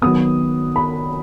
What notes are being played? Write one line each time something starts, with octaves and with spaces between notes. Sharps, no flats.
D#3 F#3 B3 D#6
B5